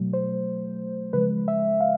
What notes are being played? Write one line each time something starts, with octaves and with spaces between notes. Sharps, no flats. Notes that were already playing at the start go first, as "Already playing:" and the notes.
Already playing: B2 F#3 A3
C5
C#3 F3 G#3 B4
E5
F5